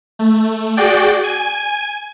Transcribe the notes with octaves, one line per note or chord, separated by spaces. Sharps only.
A3
F#4 G#4 D5 G5
G#5